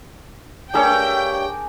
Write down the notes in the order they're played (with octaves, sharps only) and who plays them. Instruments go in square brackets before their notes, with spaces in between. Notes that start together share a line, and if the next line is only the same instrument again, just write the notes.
[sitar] G2 A3 C#5 [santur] D4 G#4 A#4 [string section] G5